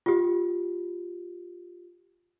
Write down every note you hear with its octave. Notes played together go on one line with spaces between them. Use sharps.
F4 G4